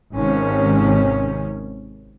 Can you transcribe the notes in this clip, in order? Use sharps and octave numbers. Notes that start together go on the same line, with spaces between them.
G#1 C3 D#3 C#4